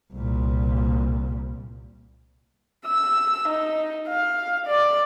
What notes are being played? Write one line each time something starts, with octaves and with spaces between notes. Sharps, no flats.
C2 A#2
E6
D#4
F5
D5